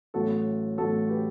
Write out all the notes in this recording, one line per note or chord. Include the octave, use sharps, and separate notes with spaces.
A1 A2 F#3 F#4 A4
A1 A2 F#3 F#4 A4
G4 B4